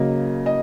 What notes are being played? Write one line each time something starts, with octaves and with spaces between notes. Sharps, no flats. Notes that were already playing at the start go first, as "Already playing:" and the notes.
Already playing: C#3 F#3 A#3 D#5
D#5